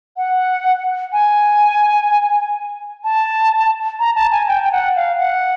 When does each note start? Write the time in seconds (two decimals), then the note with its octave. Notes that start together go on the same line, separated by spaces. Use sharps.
0.17 F#5
1.13 G#5
3.04 A5
3.99 A#5
4.15 A5
4.32 G#5
4.48 G5
4.63 G5
4.72 F#5
4.96 F5
5.19 F#5